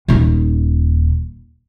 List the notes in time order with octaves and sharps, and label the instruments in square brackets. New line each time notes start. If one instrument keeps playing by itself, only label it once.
[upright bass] D#1 D#4